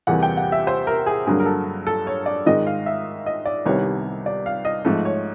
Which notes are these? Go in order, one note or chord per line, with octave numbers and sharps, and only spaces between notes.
E2 C3 E3 G3 A#3 F#5
G5
F#5
E5
C5
A#4
G#4
G2 D3 F#3 A#3 G#4
A#4
A4
A4
C#5
D5
G#2 D#3 G#3 D#5
F5
E5
D#5
D5
C2 C3 D#3 G3 B3 C#5
D5
F5
D#5
G#2 F3 A3
C#5